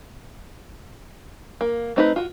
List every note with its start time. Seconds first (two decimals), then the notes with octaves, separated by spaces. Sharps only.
1.61 A#3
1.96 A3 C4 D#4 F4 B4
2.16 F4 F#4